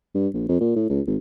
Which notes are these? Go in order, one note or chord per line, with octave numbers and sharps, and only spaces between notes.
G2
A#1
F2
A#2
A2
C#2
G#1